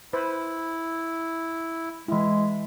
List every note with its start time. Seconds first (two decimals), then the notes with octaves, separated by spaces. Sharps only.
0.13 E4 B4 C5
2.08 E3 G#3 E4